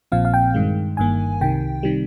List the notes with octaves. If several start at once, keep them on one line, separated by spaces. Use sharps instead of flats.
A#1 A#2 F3 C4 F5
F5
G5
G2 D#3 G#3
G1 G2 D#3 A#3 G#5
C2 C3 D#3 G5
C3 D#3 G3